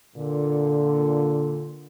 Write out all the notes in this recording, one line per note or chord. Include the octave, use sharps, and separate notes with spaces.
A#2 D3